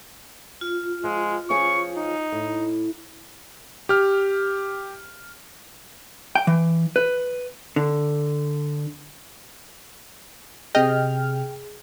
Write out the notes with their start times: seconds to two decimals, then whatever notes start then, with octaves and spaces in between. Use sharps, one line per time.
0.61 F4
1.04 F3 G#3
1.50 F3 C#4 G#4 C#6
1.97 D#4
2.32 A2
3.89 G4 F6
6.35 G5
6.47 E3
6.96 B4
7.76 D3
10.75 C3 G#4 D#5 G5 F6